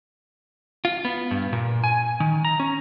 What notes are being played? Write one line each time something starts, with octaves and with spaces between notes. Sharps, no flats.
F4
B3
G2
A#2
G#5
D#3
A#5
C#4